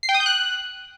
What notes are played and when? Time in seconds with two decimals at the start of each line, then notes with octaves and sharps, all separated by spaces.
0.03 C7
0.09 G5
0.14 D#6
0.20 G6
0.26 F#6